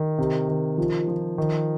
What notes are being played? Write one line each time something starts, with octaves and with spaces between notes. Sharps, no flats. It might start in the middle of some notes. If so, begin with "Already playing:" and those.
Already playing: D#3
C3
D#3
F3
F3
D#3